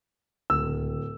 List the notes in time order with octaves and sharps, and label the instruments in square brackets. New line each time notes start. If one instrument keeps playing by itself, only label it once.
[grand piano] D1 E6 [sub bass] C#2